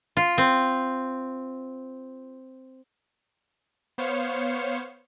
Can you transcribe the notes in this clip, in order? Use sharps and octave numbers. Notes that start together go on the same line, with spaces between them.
F4
C4
B3 C5 C#5 F5 C#7